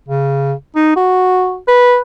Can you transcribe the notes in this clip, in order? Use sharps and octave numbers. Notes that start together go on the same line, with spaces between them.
C#3
D#4
F#4
B4